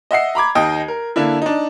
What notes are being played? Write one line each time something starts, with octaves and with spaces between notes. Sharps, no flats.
D#5 E5 F#5 C7
A#5 B5 D6 G#6
D#2 D#4 D#5 G5 D#6
A#4
D3 A#3 D4 E4
D4 D#4